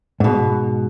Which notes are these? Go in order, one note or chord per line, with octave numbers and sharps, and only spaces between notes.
G#2 B2